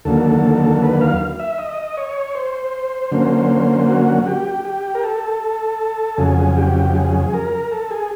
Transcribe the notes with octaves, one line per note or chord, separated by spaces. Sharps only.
D#2 D3 F#3 A#3 A4
B4
F5
E5
D#5
C#5
C5
D3 F#3 A#3 C#4
F#4
G4
G4
A#4
A4
F2 C#3 F#3 G#4
G4
G#4
A#4
A4
G#4